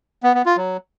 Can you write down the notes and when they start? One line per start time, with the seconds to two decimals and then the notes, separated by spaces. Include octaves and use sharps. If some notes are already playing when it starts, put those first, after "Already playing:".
0.23 B3
0.34 B3
0.46 F4
0.57 F#3